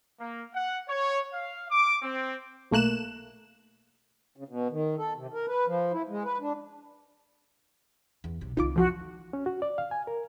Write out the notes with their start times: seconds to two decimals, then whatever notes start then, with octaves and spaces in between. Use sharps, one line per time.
0.19 A#3
0.54 F#5
0.88 C#5
1.33 F5
1.70 D6
2.02 C4
2.71 B1 A3 A#3 F#6 E7
4.37 C#3
4.48 B2
4.71 D#3
4.98 A4
5.16 C3
5.34 A#4
5.47 B4
5.67 F3
5.92 E4
6.09 G#3
6.25 B4
6.40 D4
8.24 E2
8.41 B1 C3
8.57 C2 D#3 D#4 F4 D6
8.76 F2 F3 F#4
9.33 C#4
9.46 F#4
9.62 D5
9.78 F5
9.91 G#5
10.07 A#4